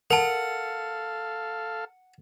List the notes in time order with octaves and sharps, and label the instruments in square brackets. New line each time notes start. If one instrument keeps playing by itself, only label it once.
[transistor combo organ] A4 F5 [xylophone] A#4 A5 [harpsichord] F#5